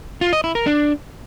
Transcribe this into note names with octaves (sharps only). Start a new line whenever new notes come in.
F4
D#5
E4
A#4
D4